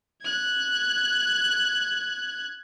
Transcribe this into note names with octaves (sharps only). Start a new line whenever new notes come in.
F#6 G#6